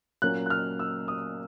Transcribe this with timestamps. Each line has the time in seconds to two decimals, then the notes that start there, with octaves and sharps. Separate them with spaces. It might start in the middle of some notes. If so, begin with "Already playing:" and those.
0.22 A#2 F#3 A#3 C#4 F#6
0.46 F#6
0.50 F6
0.79 E6
1.08 D#6